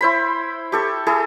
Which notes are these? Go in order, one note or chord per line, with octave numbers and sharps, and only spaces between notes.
E4 C5 B5
G4 A4 C#6
E4 G#4 A4